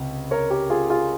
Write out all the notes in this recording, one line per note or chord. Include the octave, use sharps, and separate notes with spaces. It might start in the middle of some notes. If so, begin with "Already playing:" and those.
Already playing: C#2 C3
A#4 C#5
G4 A#4
F4 G#4
F4 G#4